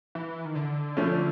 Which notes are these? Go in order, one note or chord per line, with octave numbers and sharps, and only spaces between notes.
E3
D#3
D3
F3 A3 C#4